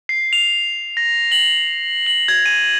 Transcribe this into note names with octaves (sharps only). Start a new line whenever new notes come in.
C7
F7
A#6
F#7
F#7
G#6
D#7